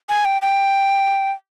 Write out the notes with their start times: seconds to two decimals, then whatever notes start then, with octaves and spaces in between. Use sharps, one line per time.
0.09 G#5
0.25 G5
0.42 G5